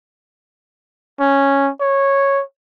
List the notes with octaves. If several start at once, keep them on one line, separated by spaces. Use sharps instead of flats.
C#4
C#5